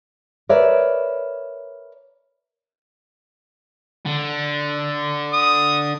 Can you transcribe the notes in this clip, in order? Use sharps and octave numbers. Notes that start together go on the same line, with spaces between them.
A#4 B4 C#5 D5 E5
D3
D#6